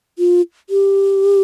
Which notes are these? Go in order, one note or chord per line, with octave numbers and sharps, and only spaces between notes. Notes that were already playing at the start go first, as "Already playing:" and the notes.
F4
G4